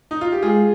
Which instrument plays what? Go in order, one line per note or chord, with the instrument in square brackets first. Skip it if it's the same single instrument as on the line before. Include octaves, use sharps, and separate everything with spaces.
[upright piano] D#4
F4
G4
[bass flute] G#3 [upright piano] F4 G#4